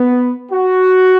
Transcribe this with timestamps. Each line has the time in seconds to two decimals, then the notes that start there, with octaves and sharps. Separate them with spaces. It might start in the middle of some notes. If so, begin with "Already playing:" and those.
Already playing: B3
0.52 F#4